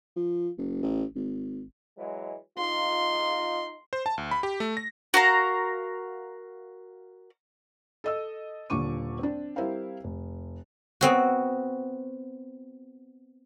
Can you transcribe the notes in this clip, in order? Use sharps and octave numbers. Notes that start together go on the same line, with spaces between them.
F3
F#1
A1
G#1
E3 F#3 G#3
D#4 F4 C6
C5
A5
D2
B5
G4
A3
A#6
F#4 A#4 F5 A#5
A4 D#5 E6
D#1 A#2 D3 C#6 D6 D#7
C4 D4
G3 C4 E4 A#4 C5 F5
F1
B3 C4 F#4